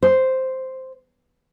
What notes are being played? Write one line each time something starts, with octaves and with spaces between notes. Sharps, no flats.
C5